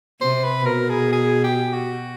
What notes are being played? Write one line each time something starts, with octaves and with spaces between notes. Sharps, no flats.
C3 C5
B4
B2 A#4
G#4
G#4
G4
F#4